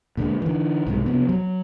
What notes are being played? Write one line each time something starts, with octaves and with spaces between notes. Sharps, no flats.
A#2 D3 G3 G#3
D3 E3
B1 G#2 C3 G#3
C3 F3 B3
F#3